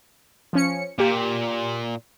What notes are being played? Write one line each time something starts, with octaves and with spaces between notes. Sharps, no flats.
F3 C#4 C#7
A#2 A#3 G4